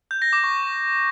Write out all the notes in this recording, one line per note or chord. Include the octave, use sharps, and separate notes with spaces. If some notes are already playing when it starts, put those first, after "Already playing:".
G6
A#6
D6
C#6